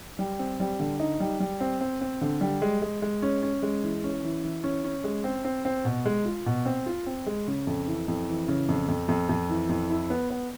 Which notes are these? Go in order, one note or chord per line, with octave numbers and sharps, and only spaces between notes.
G3
C4
G3
D3
D#4
G3
G3
C4
C4
C4
D3
G3
G#3
G#3
G#3
C#4
C#4
G#3
E3
C#4
E3
E3
C#4
C#4
G#3
C4
C4
C4
B2
G#3
F4
B2
C4
F4
C4
G#3
C#3
F2
E3
F2
E3
C#3
F2
F2
F2
F2
E3
F2
E4
B3
B3